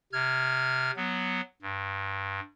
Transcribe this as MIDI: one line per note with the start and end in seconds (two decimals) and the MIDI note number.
0.13 0.91 48
0.13 0.91 89
0.13 0.91 92
0.96 1.41 54
0.96 1.41 59
1.62 2.40 43